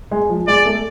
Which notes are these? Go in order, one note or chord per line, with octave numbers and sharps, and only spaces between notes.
G#3
F3
G#3 D5
A3